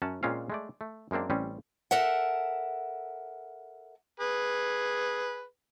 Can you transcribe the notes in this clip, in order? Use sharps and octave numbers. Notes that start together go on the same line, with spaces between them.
F#2 C#4 F#5 A5
A#2 G#3 C4 C#4 F4 F5
G#3 A3 D5
A3
F#2 G#3 A#3 C4 D4
A1 G3 C4 C#4
A4 A#4 E5 F#5
G#4 B4